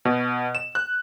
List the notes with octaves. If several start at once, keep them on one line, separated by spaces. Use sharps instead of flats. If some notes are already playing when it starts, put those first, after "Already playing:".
B2
E7
F#6